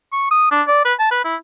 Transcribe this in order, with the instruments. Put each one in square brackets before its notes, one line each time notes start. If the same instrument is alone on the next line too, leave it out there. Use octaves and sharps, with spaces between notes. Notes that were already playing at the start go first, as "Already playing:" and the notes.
[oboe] C#6
D#6
D4
D5
B4
A5
B4
E4